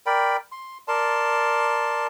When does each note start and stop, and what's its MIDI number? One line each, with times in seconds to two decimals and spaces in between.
0.06 0.37 70
0.06 0.37 74
0.06 0.37 79
0.06 0.37 83
0.52 0.78 84
0.88 2.07 70
0.88 2.07 74
0.88 2.07 81
0.88 2.07 84